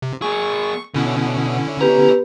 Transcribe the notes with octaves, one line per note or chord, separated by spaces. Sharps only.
C3
A#3 G#4 C#6
B2 D3 C#4 E4
B3 G4 B4 A#5